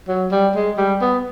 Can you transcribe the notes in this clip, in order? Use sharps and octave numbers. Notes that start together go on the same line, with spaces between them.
F#3
G3
G#3
G3
B3